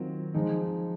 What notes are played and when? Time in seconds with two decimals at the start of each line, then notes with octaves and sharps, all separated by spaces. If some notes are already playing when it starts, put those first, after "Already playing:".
Already playing: D#3 F#3 C4 F4
0.34 F3 G#3 D#4